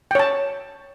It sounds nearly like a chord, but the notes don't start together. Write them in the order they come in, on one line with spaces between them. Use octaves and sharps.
G5 C#5 A5